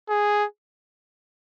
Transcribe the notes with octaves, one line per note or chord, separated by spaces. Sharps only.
G#4